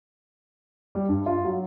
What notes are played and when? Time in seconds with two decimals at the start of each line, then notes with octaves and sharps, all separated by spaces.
0.95 G3
1.09 G2
1.26 F4
1.44 F#3